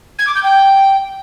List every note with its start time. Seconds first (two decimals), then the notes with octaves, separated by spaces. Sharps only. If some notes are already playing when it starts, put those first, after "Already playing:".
0.19 G#6
0.27 D6
0.35 G6
0.43 G5